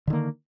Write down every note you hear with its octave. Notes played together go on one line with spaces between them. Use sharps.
D3 D#3 A#3